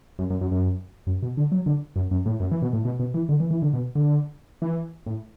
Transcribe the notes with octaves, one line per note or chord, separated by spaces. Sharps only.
F#2
F#2
F#2
F#2
F#2
B2
D3
F#3
D3
F#2
F#2
A2
F#2
E3
B2
A2
B2
B2
E3
D3
E3
E3
D3
B2
D3
E3
A2